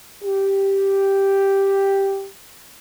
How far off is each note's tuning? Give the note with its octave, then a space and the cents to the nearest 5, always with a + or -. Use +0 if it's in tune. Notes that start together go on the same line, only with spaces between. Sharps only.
G4 +0